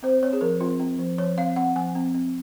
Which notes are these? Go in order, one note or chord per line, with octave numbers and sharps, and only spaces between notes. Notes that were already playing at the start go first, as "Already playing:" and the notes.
C4 C5
C4 C#5
G#4
F3 A#4
C4 F4
C4
F3
F3 C#5
C4 F5
C4 F#5
F3 G#5
C4
C4